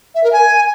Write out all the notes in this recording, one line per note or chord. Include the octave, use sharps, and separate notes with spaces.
E5
A#4
G#5